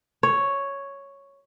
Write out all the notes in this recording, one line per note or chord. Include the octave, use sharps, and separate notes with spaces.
C#5